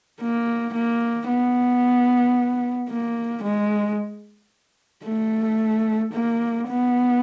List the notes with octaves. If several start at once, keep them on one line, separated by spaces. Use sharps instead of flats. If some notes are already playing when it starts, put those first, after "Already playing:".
A#3
A#3
B3
A#3
G#3
A3
A#3
B3